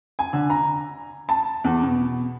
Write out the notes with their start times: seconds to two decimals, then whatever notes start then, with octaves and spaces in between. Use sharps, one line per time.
0.19 G#5
0.33 D3
0.50 A#5
1.29 A5
1.64 E2
1.83 B2